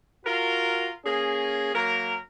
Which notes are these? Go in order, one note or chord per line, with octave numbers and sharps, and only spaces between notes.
F4 F#4 A#4
A#3 C#4 G#4
F#3 A#3 A#4